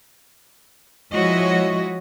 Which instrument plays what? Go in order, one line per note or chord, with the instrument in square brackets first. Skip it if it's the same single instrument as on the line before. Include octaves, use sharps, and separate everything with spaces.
[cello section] F3 G#3 E4 F#4 C#5 D#5